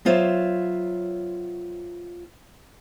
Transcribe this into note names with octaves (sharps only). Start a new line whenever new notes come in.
F#3 B3 F4 C5 C#5 E5